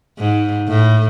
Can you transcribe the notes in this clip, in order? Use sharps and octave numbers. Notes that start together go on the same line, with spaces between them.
G#2
A2